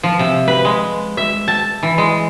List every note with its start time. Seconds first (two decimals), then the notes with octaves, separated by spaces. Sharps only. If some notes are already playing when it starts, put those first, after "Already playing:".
0.03 F3
0.19 C3
0.48 B4
0.65 G#3
1.17 E5
1.48 A5
1.83 E3
1.98 G#3